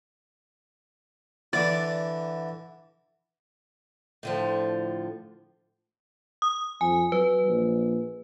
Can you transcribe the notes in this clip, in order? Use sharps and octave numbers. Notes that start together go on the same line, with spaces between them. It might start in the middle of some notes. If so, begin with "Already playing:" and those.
D3 E3 D5
A2 D3 F3
D#6
F2 G#5
F#3 B4
A#1